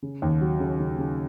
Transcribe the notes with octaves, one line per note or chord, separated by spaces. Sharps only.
C#3
D#2
F#3
C#3
C#3
C#3